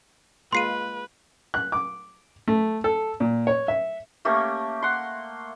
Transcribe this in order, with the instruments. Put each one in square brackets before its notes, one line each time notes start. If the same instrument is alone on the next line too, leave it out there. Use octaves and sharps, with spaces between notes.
[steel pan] G#3 A#3 F4 [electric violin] B4 [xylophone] C6 C7 D#7
[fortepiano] F#6
D6
A3
A4
A#2
C#5
E5
[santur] A3 A#3 C#4 G4
F#5 C6